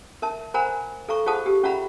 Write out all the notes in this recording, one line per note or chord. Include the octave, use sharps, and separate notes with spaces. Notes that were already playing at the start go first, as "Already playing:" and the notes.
A#4 E5 A5
A#4 C5 F#5 G#5 A#5 B5
A4 F5 A#5 C#6
F4 G#4 C5 F#5 A5 D#6
G4
C#4 F4 E5 F#5 A#5 B5